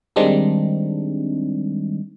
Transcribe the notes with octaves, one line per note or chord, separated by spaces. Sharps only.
D#3 G3 G#3 C4 D4 D#4